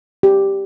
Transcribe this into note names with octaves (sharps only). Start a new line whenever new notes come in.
G4